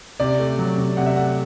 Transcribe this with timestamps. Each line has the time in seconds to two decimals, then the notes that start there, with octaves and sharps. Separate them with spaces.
0.20 C3 D5
0.39 A3
0.58 F#3
0.78 C3
0.97 C3 F#5
1.06 E5
1.16 A3 F#5